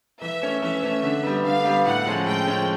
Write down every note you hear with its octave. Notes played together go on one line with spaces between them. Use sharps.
E3 E5
A3 C#4
E3 E5
A3 C#4
D3
G3 B3
D3 F5
G3 B3
A2 F#5
F3 G#3 C#4
A2 G5
F3 G#3 C#4